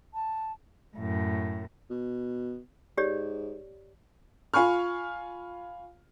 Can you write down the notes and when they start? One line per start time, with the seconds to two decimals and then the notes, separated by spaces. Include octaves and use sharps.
0.14 A5
0.97 F#2 A2
1.90 B2
2.98 G#2 G4 C#5 D5
4.54 F4 F5 G#5 B5 C#6 F6